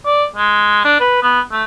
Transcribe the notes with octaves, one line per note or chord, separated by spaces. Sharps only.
D5
G#3
D4
B4
B3
A3